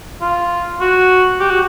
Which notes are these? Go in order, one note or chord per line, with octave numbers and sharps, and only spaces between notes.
F4
F#4
G4
F#4